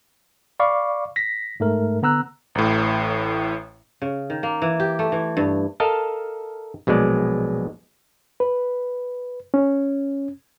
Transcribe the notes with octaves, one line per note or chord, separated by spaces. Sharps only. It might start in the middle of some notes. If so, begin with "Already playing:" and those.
D5 F5 B5 C#6 D6
A#6 B6
G#2 A3 A#4
D3 B3 A#5 E6 F#6
A1 A2
C#3
D#3
A#3
E3
G4
A3
E3
G2
A4 A#4 D#5 F5 A5
A#1 B2 F#3 G#3 D5
B4
C#4